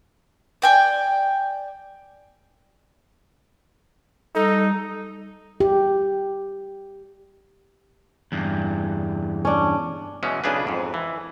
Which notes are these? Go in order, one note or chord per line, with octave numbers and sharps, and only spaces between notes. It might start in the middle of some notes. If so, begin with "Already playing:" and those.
D5 G5 G#5
G3 D#4 A4
G4
E2 G2
C#4 D4
B2 E3 G#3 C#4
B1 C#3 D4 G#4 B4
F2 G#2
E3